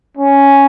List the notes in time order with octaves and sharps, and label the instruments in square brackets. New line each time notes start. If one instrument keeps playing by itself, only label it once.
[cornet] C#4